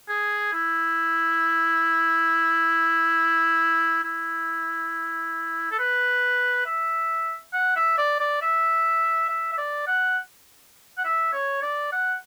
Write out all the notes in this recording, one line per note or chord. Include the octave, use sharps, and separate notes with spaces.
G#4
E4
E4
A4
B4
E5
F#5
E5
D5
D5
E5
E5
E5
D5
F#5
F#5
E5
C#5
D5
F#5